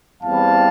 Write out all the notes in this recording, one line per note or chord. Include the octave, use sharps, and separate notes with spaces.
E2 E3 G3 C4 F5 A5